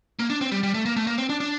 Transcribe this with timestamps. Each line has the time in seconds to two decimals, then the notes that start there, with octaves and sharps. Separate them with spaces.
0.19 A#3
0.30 D4
0.41 C4
0.52 G3
0.63 G3
0.74 A3
0.86 A#3
0.97 A3
1.07 A#3
1.18 C4
1.30 D4
1.40 D4